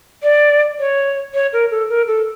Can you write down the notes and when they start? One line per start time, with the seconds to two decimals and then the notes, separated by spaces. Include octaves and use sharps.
0.23 D5
0.79 C#5
1.34 C#5
1.53 A#4
1.71 A4
1.89 A#4
2.08 A4